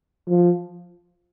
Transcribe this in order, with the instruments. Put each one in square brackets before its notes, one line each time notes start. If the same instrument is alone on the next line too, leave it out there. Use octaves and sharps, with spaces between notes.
[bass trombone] F3